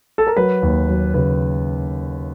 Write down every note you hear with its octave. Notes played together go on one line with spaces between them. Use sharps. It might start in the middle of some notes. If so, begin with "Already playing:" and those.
A4
A#4
F#3 B4
D#2
F#3
C#3 B4